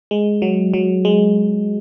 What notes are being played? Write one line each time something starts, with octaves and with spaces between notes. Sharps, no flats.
G#3
F#3
F#3
G#3